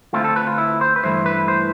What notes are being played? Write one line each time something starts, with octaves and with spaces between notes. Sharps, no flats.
D3 A3 C4 E4 F4
A4
B4
F4
E4
C5
B4
G2 E3 A3 E4 C5
B4
C5